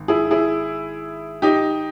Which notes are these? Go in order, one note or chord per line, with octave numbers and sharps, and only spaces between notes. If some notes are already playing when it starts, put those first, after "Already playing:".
Already playing: G#1
E4 G#4
E4 G#4
D#4 G4